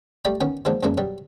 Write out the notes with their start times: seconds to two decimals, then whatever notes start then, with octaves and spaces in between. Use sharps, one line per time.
0.25 G3 A3 D5 D#5 G5 B5
0.41 D#3 B3 C#4 D#4
0.65 D#3 F3 F#3 G#3 A#3 D4
0.83 F#2 E3 G#3 A#3 D4
0.97 B2 F#3 G3